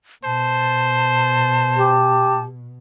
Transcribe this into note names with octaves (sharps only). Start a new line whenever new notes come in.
B2 C5 A5
G4